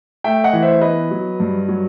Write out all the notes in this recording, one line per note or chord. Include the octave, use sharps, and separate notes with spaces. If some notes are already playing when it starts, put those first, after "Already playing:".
A3 E5 G5
D#5 F#5
E3
C5 E5
B3 B4 D#5
F#3
G2
F#3